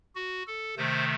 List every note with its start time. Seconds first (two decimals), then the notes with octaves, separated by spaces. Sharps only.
0.15 F#4
0.47 A4
0.77 C3 D#3 A3 C5